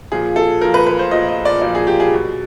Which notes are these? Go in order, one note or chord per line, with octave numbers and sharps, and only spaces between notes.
A#2 F3 G#4
A4
A#2 F3 A#4
B4
B4
C5
A#2 F3 D#5
D#5
D5
A#2 F3 D5
G#4
G4
G#4
B2 F#3